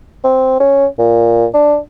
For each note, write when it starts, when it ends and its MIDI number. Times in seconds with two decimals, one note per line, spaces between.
0.24 0.55 60
0.60 0.86 61
0.99 1.46 46
1.54 1.77 62